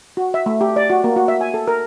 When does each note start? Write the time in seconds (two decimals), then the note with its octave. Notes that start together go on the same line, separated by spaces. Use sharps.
0.17 F#4
0.34 E5
0.46 A3
0.61 G4
0.76 D5
0.90 F#4
1.04 A#3
1.16 F#4
1.28 E5
1.41 G#5
1.54 A4
1.68 A#4